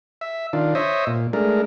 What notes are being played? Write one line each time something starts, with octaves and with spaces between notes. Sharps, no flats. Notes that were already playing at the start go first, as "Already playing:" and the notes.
E5
D#3 D4 F4
C5 C#5 D#5 E5
A#2
G#3 A3 D4 A#4